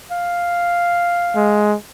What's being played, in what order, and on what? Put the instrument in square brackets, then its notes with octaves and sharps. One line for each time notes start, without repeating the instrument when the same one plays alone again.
[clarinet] F5
[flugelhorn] G#3